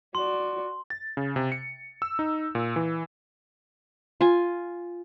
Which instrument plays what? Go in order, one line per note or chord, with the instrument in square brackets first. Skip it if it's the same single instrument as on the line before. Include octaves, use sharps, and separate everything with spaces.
[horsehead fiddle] F#4 D5 [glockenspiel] C6
[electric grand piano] A6
C#3
C3
C#7
E6
D#4
A#2
E3
[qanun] F4 G#5